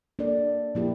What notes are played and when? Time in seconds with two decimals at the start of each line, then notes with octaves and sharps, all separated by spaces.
0.19 A#3 D4 A4 D5
0.75 A#2 F3 A#3 E4 G4